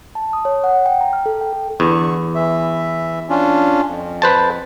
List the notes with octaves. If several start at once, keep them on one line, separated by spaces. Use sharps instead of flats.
A5
D#6
C#5
F#5
G5
A#5
F6
A4
G5
A4
E2 D3 C#6
E3 E5
C#4 D4 F4
F2
B4 C5 A5